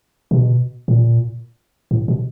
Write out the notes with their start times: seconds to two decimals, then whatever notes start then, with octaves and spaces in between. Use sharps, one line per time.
0.31 C3
0.37 B2
0.88 A#2
1.91 A2
2.08 B2